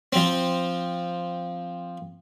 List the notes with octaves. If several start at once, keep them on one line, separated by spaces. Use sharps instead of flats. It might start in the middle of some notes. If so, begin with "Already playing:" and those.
F3 C4